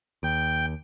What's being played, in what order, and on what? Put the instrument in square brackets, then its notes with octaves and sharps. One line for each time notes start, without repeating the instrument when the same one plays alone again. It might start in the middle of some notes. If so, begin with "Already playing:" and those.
[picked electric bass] D#2 [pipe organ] G5